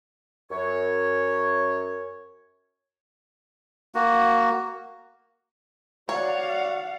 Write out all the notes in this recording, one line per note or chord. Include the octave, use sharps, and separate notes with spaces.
F#2 C#5
A#3 F#4
F#4 C#5 D5 F5 F#5